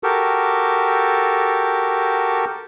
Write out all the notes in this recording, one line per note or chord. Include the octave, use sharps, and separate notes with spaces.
F#4 G4 A4 A#4